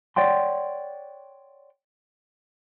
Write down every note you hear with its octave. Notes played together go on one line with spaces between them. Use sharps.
C#5 D5 F#5 G5 C6